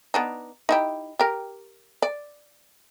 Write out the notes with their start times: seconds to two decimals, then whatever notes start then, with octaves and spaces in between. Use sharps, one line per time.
0.14 B3 D4 D#4
0.69 D#4 E4 G4
1.19 G4 A#4
2.02 D5